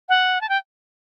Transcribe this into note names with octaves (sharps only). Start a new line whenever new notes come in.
F#5
A5
G5